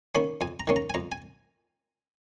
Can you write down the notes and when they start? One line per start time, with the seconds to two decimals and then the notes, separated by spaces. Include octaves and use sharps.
0.15 D#3 A#3 C#4 B5
0.41 F2 G#5
0.60 A#5
0.67 D#3 A#3 C#4
0.76 A#5
0.90 G#5
0.94 F2 A#5
1.12 G#5